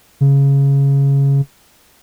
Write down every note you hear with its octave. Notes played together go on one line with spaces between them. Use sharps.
C#3